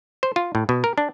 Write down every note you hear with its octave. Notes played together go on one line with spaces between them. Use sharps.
C5
F4
A2
B2
A#4
D4